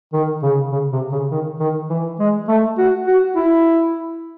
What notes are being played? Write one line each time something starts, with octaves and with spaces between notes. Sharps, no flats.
D#3
C#3
C#3
C3
C#3
D#3
D#3
E3
G#3
A3
F#4
F#4
E4